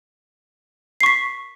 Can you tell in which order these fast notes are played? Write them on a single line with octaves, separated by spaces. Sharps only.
C7 C#6 B6